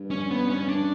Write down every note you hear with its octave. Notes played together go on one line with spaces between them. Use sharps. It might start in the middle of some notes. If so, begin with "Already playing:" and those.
Already playing: G2
C#4
B3
C#4
D4